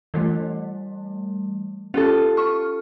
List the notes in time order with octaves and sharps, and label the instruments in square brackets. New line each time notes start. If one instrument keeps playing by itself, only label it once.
[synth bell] E3 G3 A3
[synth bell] C#4 G4 [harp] F4 A4
[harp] C#6 [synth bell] F6